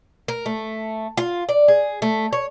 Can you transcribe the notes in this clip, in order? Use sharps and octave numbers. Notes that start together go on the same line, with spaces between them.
A#4
A3
F4
D5
G#4
A3
C#5